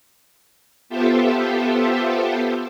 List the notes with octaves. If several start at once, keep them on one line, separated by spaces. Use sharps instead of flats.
B3 F4 G4 A4 C5 E5